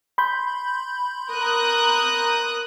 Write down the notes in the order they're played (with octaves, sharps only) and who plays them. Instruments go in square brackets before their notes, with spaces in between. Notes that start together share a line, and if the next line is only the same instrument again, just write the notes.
[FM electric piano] B5 C6 G6
[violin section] A#4 D#6 F#6